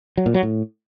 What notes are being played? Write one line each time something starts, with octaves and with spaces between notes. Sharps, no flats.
F#3
A#2
F#3
A2